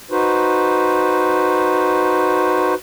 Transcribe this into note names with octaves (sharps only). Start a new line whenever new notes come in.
D#4 F#4 B4 C5